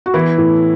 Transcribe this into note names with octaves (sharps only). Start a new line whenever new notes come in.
F#4
E3 B3 E4
A2